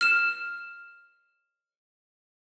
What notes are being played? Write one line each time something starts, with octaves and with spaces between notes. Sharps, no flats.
F6 E7